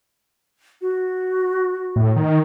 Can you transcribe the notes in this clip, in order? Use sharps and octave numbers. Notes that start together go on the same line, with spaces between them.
F#4
A2
D#3